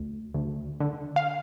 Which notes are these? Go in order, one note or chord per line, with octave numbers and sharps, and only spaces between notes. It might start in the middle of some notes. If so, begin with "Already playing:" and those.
Already playing: D2
D2
D3
F5